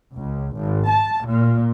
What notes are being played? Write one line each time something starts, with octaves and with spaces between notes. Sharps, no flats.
C#2
G#1
A5
A#2